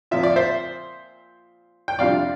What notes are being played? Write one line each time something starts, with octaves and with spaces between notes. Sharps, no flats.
A#2 F3 C4 F4 E5
D5
C5 E5
G5
F2 C3 G3 D4 F4 D5 F5